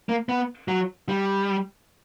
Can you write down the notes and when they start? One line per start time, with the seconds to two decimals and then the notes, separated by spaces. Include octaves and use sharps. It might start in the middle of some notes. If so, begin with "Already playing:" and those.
0.09 A#3
0.29 B3
0.68 F#3
1.09 G3